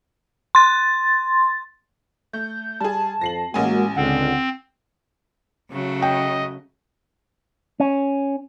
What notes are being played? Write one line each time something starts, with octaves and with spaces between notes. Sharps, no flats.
C6 A6
A3 G6
G3 G#4 A5
F2 A#6 C7 F#7
A1 G#3 A#3 C#4 F#4 G#5
C#2 D3 C4 F#5
C#3 F#3 A3
D#5 G5
C#4